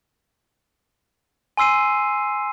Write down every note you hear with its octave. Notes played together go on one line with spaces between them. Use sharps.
G#5 C6 E6 C7 D#7